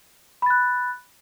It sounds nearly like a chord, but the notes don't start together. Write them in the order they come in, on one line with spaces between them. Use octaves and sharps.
B5 A6 F#6